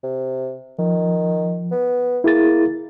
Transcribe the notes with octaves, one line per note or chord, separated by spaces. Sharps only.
C3
D#3 F3
B3
A#3 E4 G#4 A6